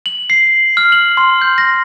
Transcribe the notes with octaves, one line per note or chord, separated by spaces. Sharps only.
F#7
C7
F6
F#7
C6
G6
A#6